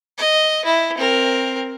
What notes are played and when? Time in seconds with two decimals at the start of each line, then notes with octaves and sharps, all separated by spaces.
0.18 D#5
0.65 E4
0.98 C4 A#4